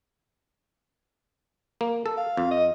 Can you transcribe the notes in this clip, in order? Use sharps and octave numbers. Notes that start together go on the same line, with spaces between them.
A#3
A4
F5
F2
D#5